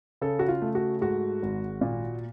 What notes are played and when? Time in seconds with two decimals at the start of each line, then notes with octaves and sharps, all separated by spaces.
0.21 C#3 A4
0.39 F#4
0.48 F4
0.62 A3
0.75 F#4
1.01 G#2 F#4
1.42 G#1
1.81 A#2